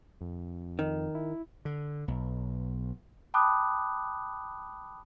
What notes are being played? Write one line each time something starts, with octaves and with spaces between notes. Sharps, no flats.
F2
D#3
E4
D3
B1
G5 A5 B5 D6 D#6 F#6